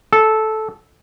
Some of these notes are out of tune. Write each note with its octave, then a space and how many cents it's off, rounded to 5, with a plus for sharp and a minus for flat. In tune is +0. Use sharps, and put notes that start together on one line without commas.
A4 -10